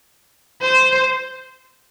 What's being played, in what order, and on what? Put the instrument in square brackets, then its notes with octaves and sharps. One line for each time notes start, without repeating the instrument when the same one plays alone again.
[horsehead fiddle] C5